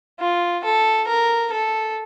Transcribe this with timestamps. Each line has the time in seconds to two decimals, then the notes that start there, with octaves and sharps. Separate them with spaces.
0.20 F4
0.65 A4
1.08 A#4
1.53 A4